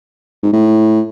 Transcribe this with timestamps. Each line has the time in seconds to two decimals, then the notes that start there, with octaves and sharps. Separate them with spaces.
0.43 G#2
0.53 A2